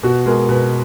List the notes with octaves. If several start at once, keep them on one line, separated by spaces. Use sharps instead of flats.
B2 F#4
G#3 A#4
B2 B4